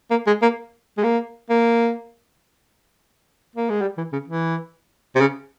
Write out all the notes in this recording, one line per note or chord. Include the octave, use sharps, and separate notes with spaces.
A#3
G#3
A#3
G#3
A#3
A#3
A#3
G#3
G3
E3
C#3
E3
C3
C#3